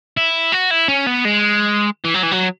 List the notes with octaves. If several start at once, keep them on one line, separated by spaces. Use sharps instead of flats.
E4
F#4
E4
C#4
B3
G#3
E3
F#3
E3
F#3